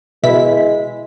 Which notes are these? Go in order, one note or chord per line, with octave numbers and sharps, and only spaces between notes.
B2 G#3 E4 B6